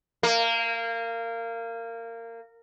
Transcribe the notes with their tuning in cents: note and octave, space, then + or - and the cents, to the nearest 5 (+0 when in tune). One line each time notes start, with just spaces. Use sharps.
A#3 -20